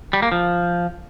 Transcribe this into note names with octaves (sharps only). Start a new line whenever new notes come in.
G3
A#3
F3